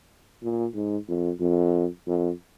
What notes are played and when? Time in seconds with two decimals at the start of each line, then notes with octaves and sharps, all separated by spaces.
0.43 A#2
0.75 G#2
1.08 F2
1.41 F2
2.07 F2